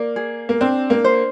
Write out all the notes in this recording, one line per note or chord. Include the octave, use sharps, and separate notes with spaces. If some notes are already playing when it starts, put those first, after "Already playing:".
Already playing: A#3 D5
G#4
A#3
C4 D4
A#3
C5